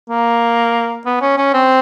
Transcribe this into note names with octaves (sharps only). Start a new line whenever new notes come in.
A#3
B3
C#4
C#4
C4